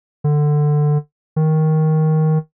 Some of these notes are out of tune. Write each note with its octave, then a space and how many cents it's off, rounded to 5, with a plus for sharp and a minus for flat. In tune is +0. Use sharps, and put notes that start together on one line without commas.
D3 +15
D#3 +10